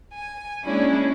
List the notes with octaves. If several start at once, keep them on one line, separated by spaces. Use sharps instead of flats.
G#5
G#3 A#3 C#4 D4 E4 G#4